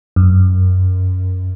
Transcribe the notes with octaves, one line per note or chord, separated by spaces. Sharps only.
F#2